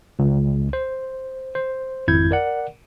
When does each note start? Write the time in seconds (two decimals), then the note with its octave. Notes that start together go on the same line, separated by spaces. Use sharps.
0.19 C#2
0.73 C5
1.55 C5
2.08 G#1 F2 E4 G6 G#6
2.31 A#4 D5 F#5